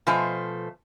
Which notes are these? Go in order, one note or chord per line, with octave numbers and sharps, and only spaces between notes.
B2 F3 A3 C5 G#5